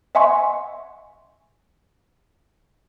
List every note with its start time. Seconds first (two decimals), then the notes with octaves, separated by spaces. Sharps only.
0.15 D#5 E5 F#5 G#5 C6 C#6